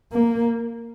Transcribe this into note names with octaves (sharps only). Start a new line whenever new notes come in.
A#3